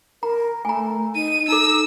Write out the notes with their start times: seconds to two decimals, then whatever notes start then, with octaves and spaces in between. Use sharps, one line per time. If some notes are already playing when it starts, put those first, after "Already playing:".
0.23 A#4 A#5
0.65 A3 G#5 A#5
1.15 D#4 D#7
1.48 D#4 A4 A#5 E6